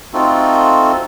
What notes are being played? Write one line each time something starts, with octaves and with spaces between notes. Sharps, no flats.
A3 C4 D#4 F4 F#4 A4